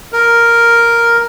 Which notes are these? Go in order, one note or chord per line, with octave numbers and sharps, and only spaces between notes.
A#4